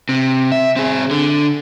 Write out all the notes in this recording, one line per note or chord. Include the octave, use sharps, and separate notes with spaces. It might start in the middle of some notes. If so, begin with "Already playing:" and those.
C3
E5
C4 G#4
D3